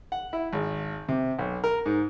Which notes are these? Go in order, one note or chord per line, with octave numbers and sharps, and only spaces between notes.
F#5
E4
G#1
C3
B1
A#4
G#2